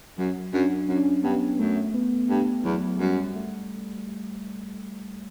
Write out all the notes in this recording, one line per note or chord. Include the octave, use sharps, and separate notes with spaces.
F#2 F#3
F#2 D4
F#2 C#4
D4
C#4
G2 B3
F#2 A3
B3
G2 A3
E2 F#3
F#2 G3
A3